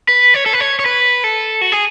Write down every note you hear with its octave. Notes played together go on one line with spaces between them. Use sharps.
B4
C#5
A4
B4
C#5
C#5
B4
A4
F#4
G#4